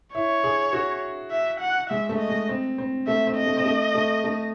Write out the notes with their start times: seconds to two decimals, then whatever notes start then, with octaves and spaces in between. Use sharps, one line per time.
0.15 E4 C#5
0.44 G#4
0.73 F#4
1.31 E5
1.61 F#5
1.90 G#3 E5
2.09 A3
2.19 D#5
2.29 G#3
2.49 C4
2.78 C4
3.07 A3 E5
3.27 C4
3.36 D#5
3.46 A3
3.57 C4
3.65 A3
3.95 A3
4.24 A3